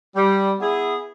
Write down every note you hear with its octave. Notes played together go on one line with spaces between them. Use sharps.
G3
B3 E4 G#4